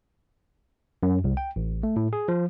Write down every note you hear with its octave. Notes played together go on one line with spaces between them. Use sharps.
F#2
C2
G5
A1
A3
A2
G#4
F3